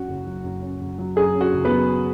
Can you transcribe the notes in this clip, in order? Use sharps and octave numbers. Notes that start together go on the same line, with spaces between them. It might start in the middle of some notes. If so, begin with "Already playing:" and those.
Already playing: F#2 C#4 F#4 F#5
F#1
F#3
F#2
C#4
F#1
F#3
F#2 G#4
C#4
F#4
F#1
B3 B4
F#3